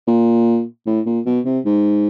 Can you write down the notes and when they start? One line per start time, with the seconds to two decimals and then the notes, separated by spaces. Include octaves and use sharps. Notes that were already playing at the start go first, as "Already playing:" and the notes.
0.07 A#2
0.86 A2
1.06 A#2
1.26 B2
1.45 C3
1.65 G#2